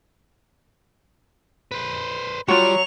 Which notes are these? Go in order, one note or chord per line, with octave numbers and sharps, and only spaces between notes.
B4 C5
F#3 G3 F4 F#4 C#6 F7